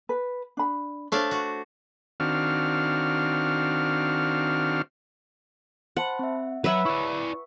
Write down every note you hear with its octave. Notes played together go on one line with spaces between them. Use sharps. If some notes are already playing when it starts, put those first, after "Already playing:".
B4
D4 B5
A3 D4 C5 C#5 F5
F#4
D#3 C4 D4 F#4 F5 F6
C5 F#5 A5 B5
C4 E5
F#3 B4 C#5 E5 F#5
E4 D5 C#6